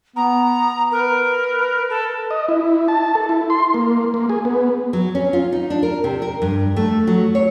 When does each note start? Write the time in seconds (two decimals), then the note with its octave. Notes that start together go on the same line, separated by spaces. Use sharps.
0.16 B3 A#5
0.91 A#4 B4
1.89 A4
2.31 D#5
2.49 E4
2.88 A5
3.15 A4
3.29 E4
3.50 C6
3.74 A#3
4.14 A#3
4.29 G#4
4.45 B3
4.93 F#3
5.15 C#4
5.33 F4
5.52 D#4
5.70 D4
5.83 A#4
6.04 C3
6.22 A#4
6.42 G2
6.76 A3
7.07 F#3
7.35 C#5